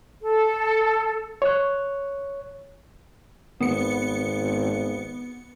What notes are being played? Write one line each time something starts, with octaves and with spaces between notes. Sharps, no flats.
A4
C#5 F#6
G#1 B3 C#7